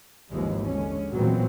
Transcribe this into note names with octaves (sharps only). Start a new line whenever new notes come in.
G#1 D#2 G#2 E3 F3 G#3
D3 G#3 C#4
A#2 E3 F#3 G#3 B3 C4